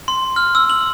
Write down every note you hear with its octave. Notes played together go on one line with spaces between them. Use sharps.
C6
F6
E6
F#7